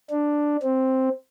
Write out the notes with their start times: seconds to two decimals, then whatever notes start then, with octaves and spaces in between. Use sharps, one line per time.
0.11 D4
0.63 C4